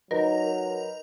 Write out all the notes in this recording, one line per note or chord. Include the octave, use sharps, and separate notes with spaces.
F#3 D#4 A#4 B4